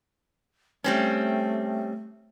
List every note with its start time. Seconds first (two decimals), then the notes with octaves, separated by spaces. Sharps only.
0.84 G3 A3 C4 C#4